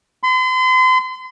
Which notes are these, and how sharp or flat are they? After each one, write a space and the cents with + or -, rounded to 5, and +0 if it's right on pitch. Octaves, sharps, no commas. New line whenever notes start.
C6 -40